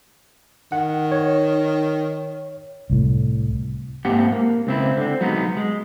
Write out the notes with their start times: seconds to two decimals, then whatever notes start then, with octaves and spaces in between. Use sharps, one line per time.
0.72 D#3 F#5
1.12 C#5
2.90 C2 A2
4.05 G#2 A#3 C4 E4 G4 F#5
4.32 A#3
4.67 C#2 C4 E4
4.97 D3 C4
5.21 F#3 G#3 B3 D#4
5.57 G#3